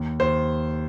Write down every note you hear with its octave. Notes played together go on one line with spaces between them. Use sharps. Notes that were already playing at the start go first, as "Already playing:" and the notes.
Already playing: D#2
D#2 C5